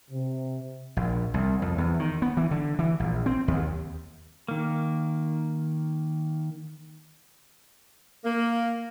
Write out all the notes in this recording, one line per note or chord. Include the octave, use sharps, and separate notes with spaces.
C3
A#1
C2
F2
E2
D#3
B3
E3
D3
E3
A#1
C4
D#2
D#3 A#3
A#3